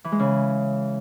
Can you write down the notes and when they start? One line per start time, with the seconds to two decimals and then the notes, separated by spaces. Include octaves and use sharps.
0.04 E3
0.12 G#3
0.19 C#3